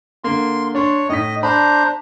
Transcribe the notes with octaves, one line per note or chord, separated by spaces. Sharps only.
D3 A#3 C6
D4 C#5 C6
A2 D#4 D#5 B6
D4 C5 A#5 B5